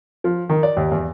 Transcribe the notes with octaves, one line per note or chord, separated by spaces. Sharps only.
F3
D#3
D5
D#2
E2